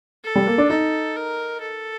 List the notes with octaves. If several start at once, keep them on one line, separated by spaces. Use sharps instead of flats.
A4
G3
A#3
D4
D#4 A4
A#4
A4